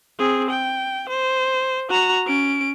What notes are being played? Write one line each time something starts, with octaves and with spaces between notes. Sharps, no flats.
C4 G#4
G5
C5
F#4 A#5
C#4 D7